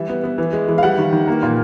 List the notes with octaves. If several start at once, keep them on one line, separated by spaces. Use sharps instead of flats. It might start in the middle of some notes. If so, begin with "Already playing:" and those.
Already playing: E3 G3 E5
B3
B3
E3
G#3
E3
F5
G3 F#5
D#3
D#3
A#3
A#2